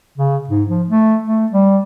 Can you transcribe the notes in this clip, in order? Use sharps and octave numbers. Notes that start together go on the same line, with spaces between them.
C#3
G#2
F3
A3
A3
G3